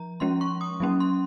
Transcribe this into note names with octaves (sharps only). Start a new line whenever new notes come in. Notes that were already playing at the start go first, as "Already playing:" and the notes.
Already playing: F3 A#5
F3 G#3 C#4 C6
C#6
D#6
F#3 A#3 C#4
C6